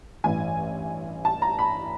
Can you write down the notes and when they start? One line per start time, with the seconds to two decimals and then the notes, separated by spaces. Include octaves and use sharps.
0.24 A1 G2 E3 G#5
1.25 A5
1.42 A#5
1.59 B5